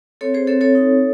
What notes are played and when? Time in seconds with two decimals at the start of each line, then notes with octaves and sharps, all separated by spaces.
0.21 C4 A4 C#5
0.34 G#4 C5
0.47 C4 A4 C#5
0.61 A4 C#5
0.75 D#4